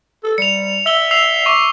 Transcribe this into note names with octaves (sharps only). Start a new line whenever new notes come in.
A4
G3 C#7 F7
E5 E6 G7
E6 C7 F7
C#6 D6